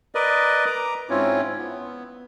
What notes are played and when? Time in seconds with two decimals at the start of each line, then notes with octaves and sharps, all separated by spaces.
0.15 A#4 B4 D5 D#5
0.66 A#5 D6
1.10 G#2 C4 C#4 E4 F4 C#5
1.58 B3